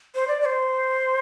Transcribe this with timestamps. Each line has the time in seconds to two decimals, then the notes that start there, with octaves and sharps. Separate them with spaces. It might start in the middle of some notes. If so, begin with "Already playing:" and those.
0.15 C5
0.28 D5
0.41 D5
0.45 C5